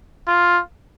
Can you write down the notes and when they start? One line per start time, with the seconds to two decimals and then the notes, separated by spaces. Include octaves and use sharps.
0.27 F4